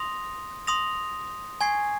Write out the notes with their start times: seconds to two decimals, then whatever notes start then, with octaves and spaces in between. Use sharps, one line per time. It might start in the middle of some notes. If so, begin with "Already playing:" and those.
Already playing: C6 D#6 A#6 F7
0.67 C6 D#6 A#6 F7
1.61 G#5 C#6 G#6 C7